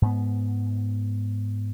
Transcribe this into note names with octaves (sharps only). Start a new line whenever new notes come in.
G#2 B3